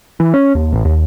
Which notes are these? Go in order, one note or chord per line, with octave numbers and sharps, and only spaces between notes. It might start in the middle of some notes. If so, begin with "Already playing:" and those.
E3
C#4
D#2
A1
D#2